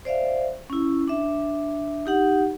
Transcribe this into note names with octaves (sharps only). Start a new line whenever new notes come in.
C5 D5 E5 F5
C#4 E4
D4 E5
D#4 G4 F#5